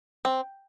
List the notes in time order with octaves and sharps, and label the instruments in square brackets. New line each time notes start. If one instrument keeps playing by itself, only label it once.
[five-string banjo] C4